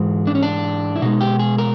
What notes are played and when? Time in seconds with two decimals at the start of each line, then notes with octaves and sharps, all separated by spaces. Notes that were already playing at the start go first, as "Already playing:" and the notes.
Already playing: G#2 E3 G#3
0.27 D4
0.35 C#4
0.43 D4
0.96 E4
1.02 B2 G#3 D#4
1.21 G4
1.39 G#4
1.58 A#4